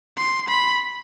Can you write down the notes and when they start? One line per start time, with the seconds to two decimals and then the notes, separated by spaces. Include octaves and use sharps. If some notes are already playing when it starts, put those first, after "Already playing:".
0.18 C6
0.49 B5